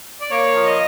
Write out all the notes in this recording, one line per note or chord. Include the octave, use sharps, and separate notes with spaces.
D5
A#3 C#5
F3
D#5